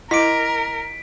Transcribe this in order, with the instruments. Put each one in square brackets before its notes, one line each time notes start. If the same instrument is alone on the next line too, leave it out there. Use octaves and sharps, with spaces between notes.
[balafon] E4 [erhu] A#4 [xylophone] D#5 D6 [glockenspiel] B6 D7